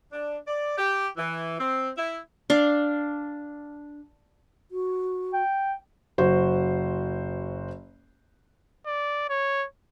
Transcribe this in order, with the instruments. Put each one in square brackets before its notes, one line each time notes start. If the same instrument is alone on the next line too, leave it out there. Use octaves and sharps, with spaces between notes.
[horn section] D4
D5
G4
E3
C4
E4
[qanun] D4 F5
[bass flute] F#4
[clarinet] G5
[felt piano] F#1 F#4 C5
[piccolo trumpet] D5
C#5